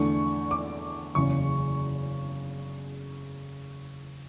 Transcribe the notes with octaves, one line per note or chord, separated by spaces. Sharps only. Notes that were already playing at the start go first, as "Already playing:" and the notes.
Already playing: E2 D3 A3 D4 C#6
D6
F#1 E2 C#3 C#6